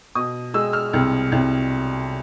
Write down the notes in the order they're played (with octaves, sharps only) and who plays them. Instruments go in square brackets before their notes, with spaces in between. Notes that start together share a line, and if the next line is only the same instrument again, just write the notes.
[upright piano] B2 D#6
G#3 E6
F6
C2
C2